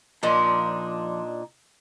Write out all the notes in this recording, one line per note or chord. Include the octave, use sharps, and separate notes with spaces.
A#2 F3 D4 D#4 C6